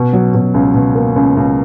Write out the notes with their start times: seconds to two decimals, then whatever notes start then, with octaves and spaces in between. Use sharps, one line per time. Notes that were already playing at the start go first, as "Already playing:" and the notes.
Already playing: B2
0.13 F#3
0.34 B2
0.54 C#2
0.74 B2
0.95 A#3
1.16 C#2
1.37 C#2